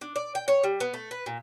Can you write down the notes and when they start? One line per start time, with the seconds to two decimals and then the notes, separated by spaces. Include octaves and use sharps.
0.01 D4
0.16 D5
0.35 G5
0.48 C#5
0.64 G3
0.80 B3
0.94 A3
1.11 B4
1.26 A#2